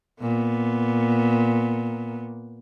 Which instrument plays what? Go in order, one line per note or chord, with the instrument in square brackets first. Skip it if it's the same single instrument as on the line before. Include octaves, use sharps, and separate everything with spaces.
[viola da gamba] A#2 B3